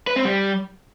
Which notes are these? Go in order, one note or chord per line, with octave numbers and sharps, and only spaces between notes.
B4
C4
G3